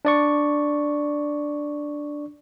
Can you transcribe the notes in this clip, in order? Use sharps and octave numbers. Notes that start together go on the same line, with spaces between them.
D4 D5 C#6